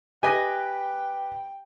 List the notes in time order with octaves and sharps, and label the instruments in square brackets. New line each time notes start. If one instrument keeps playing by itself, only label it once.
[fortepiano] G4 B4 [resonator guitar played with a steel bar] D#5 G#5 [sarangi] G5